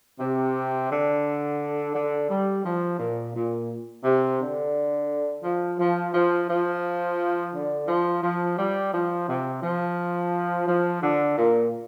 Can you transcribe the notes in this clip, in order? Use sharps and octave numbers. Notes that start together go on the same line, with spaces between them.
C3
D3
D3
G3
F3
A#2
A#2
C3
D3
F3
F3
F3
F3
D3
F3
F3
G3
F3
C3
F3
F3
D3
A#2